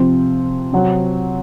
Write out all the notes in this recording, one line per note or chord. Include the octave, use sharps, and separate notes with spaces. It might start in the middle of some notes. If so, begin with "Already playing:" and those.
Already playing: C3 F3 C4 F4
C3 F#3 C4 F#4